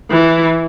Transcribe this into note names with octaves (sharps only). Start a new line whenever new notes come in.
E3